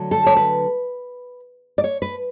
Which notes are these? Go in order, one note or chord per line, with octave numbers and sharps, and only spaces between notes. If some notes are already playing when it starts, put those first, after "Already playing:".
Already playing: D3 F#3 A3
A4
C#5
B4
D5
C#5
B4